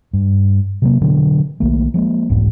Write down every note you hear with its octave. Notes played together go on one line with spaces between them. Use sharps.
G2
C3 F#3 A#3
B2 D3 F#3
B1 D#3 A3 A#3
F3 G#3 A#3
E1 C2 G#2 B3